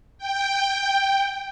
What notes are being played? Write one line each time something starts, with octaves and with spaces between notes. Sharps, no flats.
G5